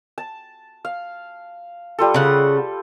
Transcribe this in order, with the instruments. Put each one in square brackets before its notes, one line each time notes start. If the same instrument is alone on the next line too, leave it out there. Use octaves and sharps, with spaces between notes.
[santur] A5
F5
G3 F4 A4
[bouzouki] C#3 F#5